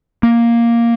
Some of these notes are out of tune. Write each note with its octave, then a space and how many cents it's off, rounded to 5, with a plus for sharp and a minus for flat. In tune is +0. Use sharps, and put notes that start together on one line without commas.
A#3 +5